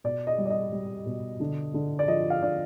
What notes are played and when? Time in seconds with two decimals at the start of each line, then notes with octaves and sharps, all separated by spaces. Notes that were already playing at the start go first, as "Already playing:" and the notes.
0.04 B2 D5
0.27 D#5
0.38 G3
0.46 D5
0.50 D#5
0.72 G3
1.06 B2
1.40 D3
1.74 D3
1.99 D5
2.08 F3 D#5
2.30 F5
2.42 D3 D5